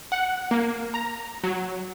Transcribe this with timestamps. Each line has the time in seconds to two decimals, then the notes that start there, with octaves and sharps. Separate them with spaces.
0.12 F#5
0.51 A#3
0.94 A#5
1.44 F#3